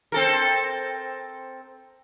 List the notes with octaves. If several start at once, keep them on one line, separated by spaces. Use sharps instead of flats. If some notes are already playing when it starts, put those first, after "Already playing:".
C4 A4 A#4